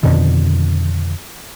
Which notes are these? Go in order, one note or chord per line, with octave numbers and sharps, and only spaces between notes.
F2 B2 D3 D#3